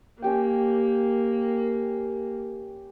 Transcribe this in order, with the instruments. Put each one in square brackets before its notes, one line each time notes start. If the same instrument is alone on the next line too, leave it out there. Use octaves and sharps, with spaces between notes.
[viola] A#3 [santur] C#4 G4 G5